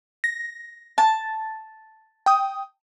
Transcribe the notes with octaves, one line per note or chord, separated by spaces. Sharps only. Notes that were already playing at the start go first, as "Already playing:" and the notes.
A#6
A5
G5 D#6